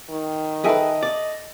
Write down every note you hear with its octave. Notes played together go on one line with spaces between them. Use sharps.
D#3
G#4 A4 B4 D#5 E5 G5
D5